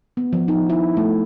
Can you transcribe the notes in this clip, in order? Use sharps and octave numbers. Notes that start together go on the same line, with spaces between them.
B3
F3
D#4
E4
A3